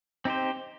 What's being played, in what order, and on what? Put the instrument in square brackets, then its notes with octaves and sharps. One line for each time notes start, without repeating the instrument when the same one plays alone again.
[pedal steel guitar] C4 D#4 G4 C5